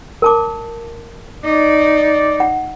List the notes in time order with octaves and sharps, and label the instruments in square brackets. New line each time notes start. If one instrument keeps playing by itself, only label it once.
[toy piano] A#4 A5 D6
[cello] D#4 [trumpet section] D5
[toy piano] F#5